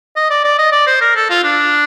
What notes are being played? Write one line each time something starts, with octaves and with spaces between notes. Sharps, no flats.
D#5
D5
D5
D#5
D5
C5
A#4
A4
F4
D4